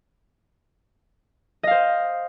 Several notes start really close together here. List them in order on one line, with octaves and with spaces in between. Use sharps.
D#5 F5 C5